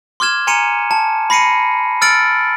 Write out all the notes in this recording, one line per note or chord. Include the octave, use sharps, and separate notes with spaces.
C6 D6 F6 G#6 E7
G#5 A#5 C6 C#7 D#7 E7
A5
B5 A#6 C7 C#7 D#7
E6 F6 A6 C#7 D7 F#7